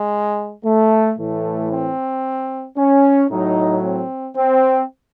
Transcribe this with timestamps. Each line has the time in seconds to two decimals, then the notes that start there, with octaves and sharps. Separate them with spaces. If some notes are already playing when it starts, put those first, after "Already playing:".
Already playing: G#3
0.65 A3
1.18 A2 E3 A3
1.71 C4
2.77 C#4
3.30 A2 F#3 D#4
3.83 C4
4.36 C4